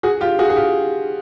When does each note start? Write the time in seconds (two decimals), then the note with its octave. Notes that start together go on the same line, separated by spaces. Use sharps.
0.03 F#4 G#4
0.21 F4 G4
0.39 F#4 G#4
0.50 G#4
0.56 F4 G4